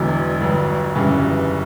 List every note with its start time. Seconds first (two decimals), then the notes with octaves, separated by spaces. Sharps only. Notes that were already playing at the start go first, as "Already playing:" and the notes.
Already playing: E1 E2 D3 F#3 B3
0.40 G1 G2 F#3
0.95 G1 F#2 C#3 E3 G3